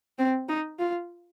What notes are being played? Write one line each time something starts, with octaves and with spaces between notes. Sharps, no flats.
C4
D#4
F4